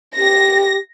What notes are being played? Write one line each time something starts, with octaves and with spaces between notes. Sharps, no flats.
G4 A#6